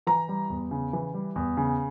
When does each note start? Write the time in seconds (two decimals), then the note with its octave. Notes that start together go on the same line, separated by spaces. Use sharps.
0.07 E3 A#5
0.29 G3
0.50 E2
0.71 C#3
0.93 E3
1.14 G3
1.36 E2
1.57 C#3